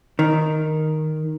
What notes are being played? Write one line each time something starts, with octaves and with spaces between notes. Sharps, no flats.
D#3